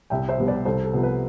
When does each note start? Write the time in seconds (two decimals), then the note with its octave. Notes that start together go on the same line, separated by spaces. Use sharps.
0.10 C2 E5 G5
0.29 C5 E5
0.38 B2 G3 B3
0.47 B4 D5
0.65 C2 A4 C5
0.84 A4
0.93 C3 F3 B3
1.03 B4